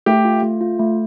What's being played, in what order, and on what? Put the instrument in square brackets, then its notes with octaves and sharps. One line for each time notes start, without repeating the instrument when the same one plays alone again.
[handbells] A3 [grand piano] G4
[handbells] F4
A3
F4
A3